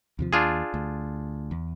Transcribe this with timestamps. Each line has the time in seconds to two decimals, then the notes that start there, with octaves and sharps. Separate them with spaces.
0.19 D#2 C3 F3
0.33 D#2 D4 F4 G#4
0.74 D2
1.51 E2